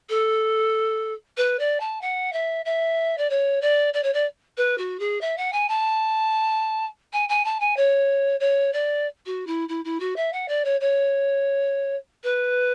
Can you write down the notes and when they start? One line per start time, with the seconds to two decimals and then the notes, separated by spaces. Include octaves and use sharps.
0.09 A4
1.37 B4
1.59 D5
1.80 A5
2.01 F#5
2.33 E5
2.65 E5
3.18 D5
3.30 C#5
3.61 D5
3.93 D5
4.03 C#5
4.13 D5
4.57 B4
4.78 F#4
4.99 G#4
5.21 E5
5.37 F#5
5.53 G#5
5.68 A5
7.13 G#5
7.29 G#5
7.44 A5
7.60 G#5
7.76 C#5
8.40 C#5
8.73 D5
9.26 F#4
9.47 E4
9.68 E4
9.84 E4
10.00 F#4
10.16 E5
10.32 F#5
10.48 D5
10.64 C#5
10.80 C#5
12.23 B4